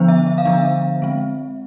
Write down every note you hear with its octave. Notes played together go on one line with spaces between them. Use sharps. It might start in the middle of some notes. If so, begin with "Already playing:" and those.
Already playing: D3 F3 B3 D4 C5
E5
E5
F5
D3 F3 B3 D4 E5
G#3 C4